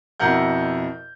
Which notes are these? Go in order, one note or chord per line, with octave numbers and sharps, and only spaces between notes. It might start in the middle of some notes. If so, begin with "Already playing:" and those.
F2 B2 E4 A#4 F#5 G6